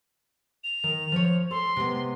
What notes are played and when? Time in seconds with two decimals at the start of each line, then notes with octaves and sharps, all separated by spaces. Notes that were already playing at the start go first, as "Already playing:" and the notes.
0.64 F7
0.84 D#3
1.12 F3 C5 C#5
1.51 A4 C6
1.76 C3 G#3 B3